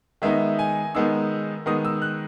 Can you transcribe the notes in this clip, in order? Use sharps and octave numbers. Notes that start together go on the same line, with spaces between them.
D#3 G#3 B3 D#4 E5
G#5
D#3 G#3 B3 D#4 E6
D#3 G#3 B3 D#4 D#6
E6
F#6